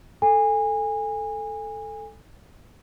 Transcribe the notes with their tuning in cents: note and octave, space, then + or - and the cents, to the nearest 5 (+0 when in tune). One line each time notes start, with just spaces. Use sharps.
A4 +0 G#5 -25